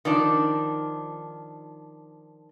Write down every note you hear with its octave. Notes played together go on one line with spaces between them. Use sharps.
D#3 F3 D4